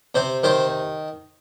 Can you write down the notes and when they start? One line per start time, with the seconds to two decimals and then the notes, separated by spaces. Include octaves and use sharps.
0.15 C3 C5
0.43 D#3 C5